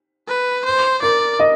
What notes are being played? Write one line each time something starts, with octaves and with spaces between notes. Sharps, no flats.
B4
C5
A#4 D5
D#5